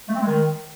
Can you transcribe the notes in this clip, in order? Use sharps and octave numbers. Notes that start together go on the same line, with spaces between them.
A3
C4
G#3
D#3